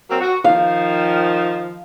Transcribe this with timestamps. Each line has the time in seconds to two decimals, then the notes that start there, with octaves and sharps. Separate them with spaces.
0.09 F#3 A#3 C4
0.21 F#4
0.44 D#3 F3 F5